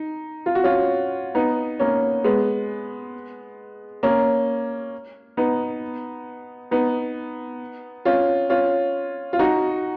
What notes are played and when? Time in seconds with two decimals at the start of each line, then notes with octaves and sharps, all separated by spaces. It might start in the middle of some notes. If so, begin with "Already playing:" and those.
Already playing: D#4
0.46 F4
0.55 F#4
0.64 C#4 F4
1.35 B3 D#4
1.79 A#3 C#4
2.24 G#3 B3
4.03 A#3 C#4
5.37 B3 D#4
6.71 B3 D#4
8.05 C#4 F4
8.49 C#4 F4
9.33 F4
9.39 D#4 F#4